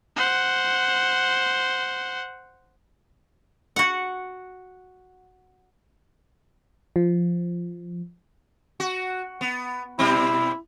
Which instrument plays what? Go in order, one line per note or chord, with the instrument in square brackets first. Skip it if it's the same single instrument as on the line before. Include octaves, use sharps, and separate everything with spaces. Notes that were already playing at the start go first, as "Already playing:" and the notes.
[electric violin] C5 F#5
[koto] F#4 F#5
[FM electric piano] F3
[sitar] F#4
B3
[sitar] B2 G3 C4 [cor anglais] E4